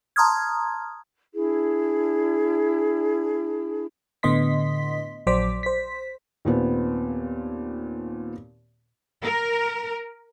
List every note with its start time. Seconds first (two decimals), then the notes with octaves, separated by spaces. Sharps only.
0.16 A5 A#5 C6 D#6 F6 G#6
1.35 D4 E4 G#4
4.23 A2 D3 B3 D#5 C6 B6
5.27 A#1 F#3 C5 D5 D6 B6
5.63 C5 B6
6.45 D#2 A#2 B3 C4
9.23 A#4